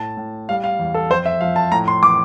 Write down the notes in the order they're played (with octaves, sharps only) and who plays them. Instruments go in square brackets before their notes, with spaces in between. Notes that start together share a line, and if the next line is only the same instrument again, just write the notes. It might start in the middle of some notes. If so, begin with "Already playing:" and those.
Already playing: [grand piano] A2 A5
A2
G3 F5
F5
E2
A4
F2 C5
E5
F3 F5
A5
A2 A#5
C6
E3 D6